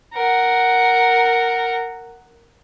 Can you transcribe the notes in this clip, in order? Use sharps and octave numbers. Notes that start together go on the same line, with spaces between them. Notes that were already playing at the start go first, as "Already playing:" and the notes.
A#4 F#5